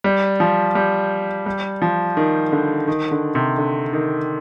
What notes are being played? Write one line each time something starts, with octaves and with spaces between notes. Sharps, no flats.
G3
F3
G3
G3
F3
D#3
D3
D#3
D3
C3
D3
D#3